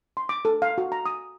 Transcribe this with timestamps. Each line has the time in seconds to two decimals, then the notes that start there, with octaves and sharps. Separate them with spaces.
0.17 C6
0.29 D6
0.45 A4
0.62 F5
0.78 F#4
0.92 A#5
1.06 D#6